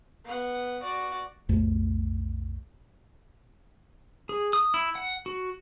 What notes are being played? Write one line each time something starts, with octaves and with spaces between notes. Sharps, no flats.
B3 F#5
F#4 D5
B1 F2 A2 A3
G#4
D#6
E4
F#5
F#4